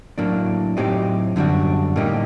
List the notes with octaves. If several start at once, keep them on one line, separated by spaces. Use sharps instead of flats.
A2 F#3 A#3 D4
A2 F#3 C4 D#4 G4
F#2 D3 G3 D4 F#4
A2 G3 A#3 D#4 G4